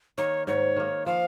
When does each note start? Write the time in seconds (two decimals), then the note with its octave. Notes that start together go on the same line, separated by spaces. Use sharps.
0.18 D#3 A#3 C#5
0.47 G#2 C#5
0.76 D#3 A#3
1.06 F3 F5